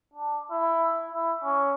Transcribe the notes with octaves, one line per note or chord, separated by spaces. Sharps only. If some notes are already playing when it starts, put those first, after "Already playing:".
D4
E4
E4
C#4